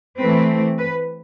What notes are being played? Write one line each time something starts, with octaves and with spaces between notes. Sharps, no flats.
E3 A3 C4 B4
B4